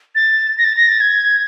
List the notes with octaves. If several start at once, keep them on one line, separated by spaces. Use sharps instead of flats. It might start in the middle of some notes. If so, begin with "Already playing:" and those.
A6
A#6
A6
A#6
A6
G#6